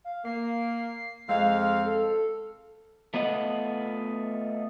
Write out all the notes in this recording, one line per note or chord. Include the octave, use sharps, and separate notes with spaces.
F5
A#3 C7
F2 G#3 C4 F5
A4
A3 B3 F4 D#5 F#5